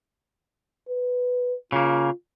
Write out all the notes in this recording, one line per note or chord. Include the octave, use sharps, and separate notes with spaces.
B4
C#3 A#3 F4